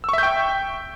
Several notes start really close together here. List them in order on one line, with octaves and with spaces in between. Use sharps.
E6 C#6 E5 G6 G5